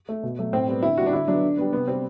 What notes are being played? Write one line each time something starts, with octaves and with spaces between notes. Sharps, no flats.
A3
B2
F#3 A3
A2 C4
G3 B3
D3 E4
G3 B3 F#4
D4
D3 E4
F#3 B3 D4
D3
G3 B3
C3 B3
G3 B3 C4